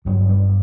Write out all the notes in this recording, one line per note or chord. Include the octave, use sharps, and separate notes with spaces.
G1 G2 D3 F#3
G3